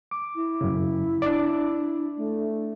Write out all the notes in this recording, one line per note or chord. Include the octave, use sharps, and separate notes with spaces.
D6
E4
F#2 C#3
D4 D5
A3